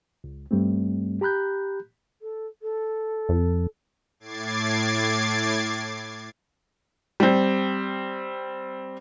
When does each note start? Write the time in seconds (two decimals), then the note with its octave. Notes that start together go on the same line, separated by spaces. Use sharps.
0.24 C#2
0.51 G2 G3 A3 C4
1.21 G4 A#5 B5 F#6 G6
2.22 A4
2.62 A4
3.29 F2
4.20 A2 D6 G#6 A6 C7
7.20 G3 C4